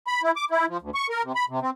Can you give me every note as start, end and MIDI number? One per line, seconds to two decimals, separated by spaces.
0.07 0.22 83
0.23 0.31 64
0.36 0.45 86
0.50 0.66 64
0.68 0.77 53
0.81 0.90 38
0.95 1.07 85
1.10 1.23 70
1.24 1.32 48
1.35 1.45 83
1.49 1.60 48
1.62 1.70 60